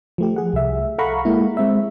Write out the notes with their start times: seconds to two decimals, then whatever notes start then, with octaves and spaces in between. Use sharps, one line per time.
0.18 F3 A3 G4
0.36 G#4 F#5
0.53 C2 E5
0.98 A4 F5 F#5 A#5 B5 C#6
1.25 G#3 A#3 E4
1.57 G#3 C4 E5